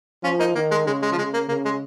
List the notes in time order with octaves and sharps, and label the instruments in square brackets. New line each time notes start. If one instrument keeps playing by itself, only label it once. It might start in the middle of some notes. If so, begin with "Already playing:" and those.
[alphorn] F3 [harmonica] C#4 F4
[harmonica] A#3 D#4
[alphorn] D#3 [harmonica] A#3
[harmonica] G#3
[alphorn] C#3 [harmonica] G#3
[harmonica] G#3
F3
[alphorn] C#3 [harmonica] G#3
[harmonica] A#3
[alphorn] C#3 [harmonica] A#3
[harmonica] G#3